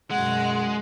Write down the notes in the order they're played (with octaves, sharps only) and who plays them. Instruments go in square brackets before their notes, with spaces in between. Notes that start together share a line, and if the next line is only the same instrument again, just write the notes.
[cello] F#2 F#5 [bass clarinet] B2 [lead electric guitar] G#3